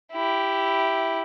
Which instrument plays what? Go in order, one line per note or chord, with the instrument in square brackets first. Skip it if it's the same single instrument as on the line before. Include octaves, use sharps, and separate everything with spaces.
[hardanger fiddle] E4 G4